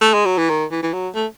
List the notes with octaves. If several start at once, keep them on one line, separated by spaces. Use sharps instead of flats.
A3
G#3
F#3
E3
D#3
E3
E3
F#3
A3